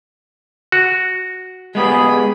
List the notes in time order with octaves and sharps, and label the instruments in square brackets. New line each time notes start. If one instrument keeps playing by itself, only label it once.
[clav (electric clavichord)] F#4
[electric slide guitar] G#3 B3 G4 [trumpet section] G#4 [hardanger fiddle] B5